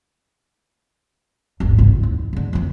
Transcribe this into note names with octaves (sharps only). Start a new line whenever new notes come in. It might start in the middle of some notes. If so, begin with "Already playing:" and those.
D#1 G#1
G1 C2
D#2
G#2 D3
F2 E3